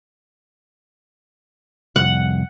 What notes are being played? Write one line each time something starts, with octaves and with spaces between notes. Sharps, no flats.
C2 F2 F#5